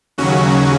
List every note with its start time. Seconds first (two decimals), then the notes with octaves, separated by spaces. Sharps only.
0.18 D#2 C#3 F#3 C#4 F#4